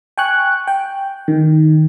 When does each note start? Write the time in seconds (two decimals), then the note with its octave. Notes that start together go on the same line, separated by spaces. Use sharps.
0.18 G5 G#5 C#6 F#6
0.68 G5
1.28 D#3